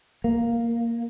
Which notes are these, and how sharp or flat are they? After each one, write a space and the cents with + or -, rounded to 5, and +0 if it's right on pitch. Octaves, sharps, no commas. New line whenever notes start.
A#3 +0